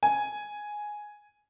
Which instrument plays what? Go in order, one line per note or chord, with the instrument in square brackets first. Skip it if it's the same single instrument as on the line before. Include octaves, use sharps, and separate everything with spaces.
[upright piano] G#5